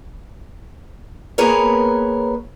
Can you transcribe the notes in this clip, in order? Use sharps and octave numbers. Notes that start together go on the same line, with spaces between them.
A#3 B3 G#4 A#4 B4 C#5